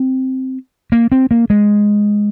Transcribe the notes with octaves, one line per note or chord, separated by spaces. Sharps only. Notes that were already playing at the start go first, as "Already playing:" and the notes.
Already playing: C4
A#3
C4
A#3
G#3